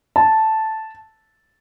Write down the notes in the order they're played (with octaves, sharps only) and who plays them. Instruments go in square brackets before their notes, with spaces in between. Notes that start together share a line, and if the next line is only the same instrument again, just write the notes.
[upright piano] A5